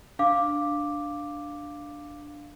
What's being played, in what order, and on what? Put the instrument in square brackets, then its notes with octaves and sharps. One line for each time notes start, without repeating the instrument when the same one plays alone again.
[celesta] D4 F5 D6